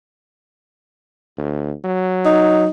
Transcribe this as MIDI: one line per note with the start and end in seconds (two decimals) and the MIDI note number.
1.38 1.72 38
1.84 2.66 54
2.25 2.70 63